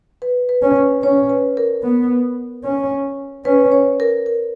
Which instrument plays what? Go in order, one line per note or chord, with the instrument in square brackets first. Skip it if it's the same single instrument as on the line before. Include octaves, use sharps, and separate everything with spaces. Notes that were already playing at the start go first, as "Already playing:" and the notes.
[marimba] B4
B4
[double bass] C#4
[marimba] B4
[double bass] C#4 [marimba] C#5
[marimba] B4
A#4
[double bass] B3
C#4
[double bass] C#4 [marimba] B4
[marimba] C#5
A#4
A#4